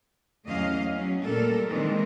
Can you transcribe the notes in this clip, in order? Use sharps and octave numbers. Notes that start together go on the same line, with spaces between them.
E2 F#3 A3 C#4 D#5 F5
F#3 C#4
A#2 G3 A3 A4 A#4
D#3 E3 G#3 C4